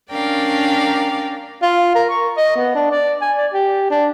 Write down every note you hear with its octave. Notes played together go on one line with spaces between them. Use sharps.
C#4 D4 A#4 D5 F5 G5
F4
A#4
C#6
D#5
B3
D4
D5
G#5
D5
G4
D4